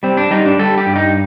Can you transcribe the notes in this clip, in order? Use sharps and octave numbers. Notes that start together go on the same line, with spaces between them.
G3 C4
D4
G3 D#4
D4
G3 A4
G4
G2
D#4